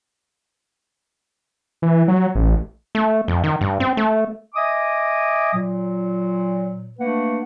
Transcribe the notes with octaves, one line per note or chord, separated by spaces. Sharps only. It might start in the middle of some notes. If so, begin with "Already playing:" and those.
E3
F#3
A1
A3
F2
D#3
G2
C4
A3
D#5 E5 G#5 D6 D#6
A#2 F#3
A3 A#3 D4 B4 F#5